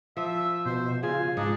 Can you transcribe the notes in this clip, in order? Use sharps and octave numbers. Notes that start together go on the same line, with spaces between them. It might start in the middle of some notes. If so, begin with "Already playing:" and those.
F3 E5
B2 C5
C#3 F4 G#5
G#2 D4 D#4